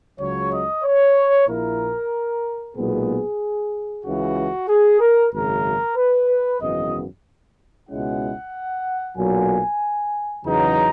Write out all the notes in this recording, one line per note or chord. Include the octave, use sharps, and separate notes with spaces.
C#2 C#3 F#3 C#5
D#5
C#5
A#1 A#2 A#3 E4 A#4
B1 A#2 G#3 B3 G#4
C#2 C#3 E3 F#4
G#4
A#4
G#1 F#2 C#3 A#4
B4
G#1 F#2 C#3 E3 B3 D#5
C#2 B2 G#3 C#4 E4 F#5
B1 A#2 F#3 G#5
E2 C#3 F#3 B3 D#4 A#5